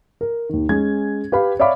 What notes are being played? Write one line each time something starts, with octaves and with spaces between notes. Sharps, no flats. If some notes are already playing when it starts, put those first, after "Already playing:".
A#4
D#2 D#3
G#3 C#4 G#6
G4 B4 F5 B5
C#5 D5 E5 F5 B5 D6